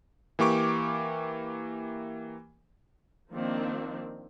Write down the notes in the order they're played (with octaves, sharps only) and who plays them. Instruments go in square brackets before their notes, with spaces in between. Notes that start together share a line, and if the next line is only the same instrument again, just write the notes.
[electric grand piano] E3 A#3 G4 C#6 D6
[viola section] D#3 F3 A#3 C4 D4